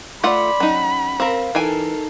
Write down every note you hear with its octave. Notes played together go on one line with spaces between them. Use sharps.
A3 F4 D5 F#5 B5 C6 D6
F#3 C#4 D#4 F#5
C4 A#4 F5
E3 D#4 A4 A#4 G5 G#5 C7